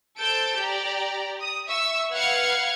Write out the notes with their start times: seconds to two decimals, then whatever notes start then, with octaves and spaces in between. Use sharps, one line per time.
0.18 A4 C5 A5 E6 G6 D7
0.58 G4 D5 A#5
1.40 D#6
1.68 E5 C#6 E6
2.12 B4 F5 F#5 F6 G#6 C#7